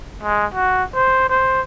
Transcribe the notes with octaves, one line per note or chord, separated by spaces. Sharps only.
G#3
F#4
C5
C5